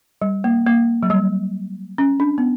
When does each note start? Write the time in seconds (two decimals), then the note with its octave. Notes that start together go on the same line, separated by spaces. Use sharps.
0.22 G3
0.44 A#3
0.67 A#3
1.03 F#3
1.10 G3
1.98 C#4
2.20 D4
2.38 B3